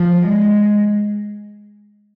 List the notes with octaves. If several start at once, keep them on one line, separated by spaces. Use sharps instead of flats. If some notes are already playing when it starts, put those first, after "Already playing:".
Already playing: F3
G#3